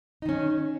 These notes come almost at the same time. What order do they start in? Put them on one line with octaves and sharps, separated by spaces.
D#4 D#3 C#4